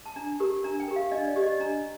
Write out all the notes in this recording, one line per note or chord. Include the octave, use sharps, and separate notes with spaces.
A5
D4 A#5
G4 A#4
D4 A#5
G5
G4 A#4
F5
D4 D#5
D5
G4 C5
D#5
D5
D4 A#5